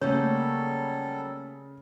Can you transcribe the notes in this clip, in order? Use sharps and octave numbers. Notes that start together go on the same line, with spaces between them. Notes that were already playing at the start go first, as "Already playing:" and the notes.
C#3 F#3 G3 A3 A#3 C#4 A4 C#5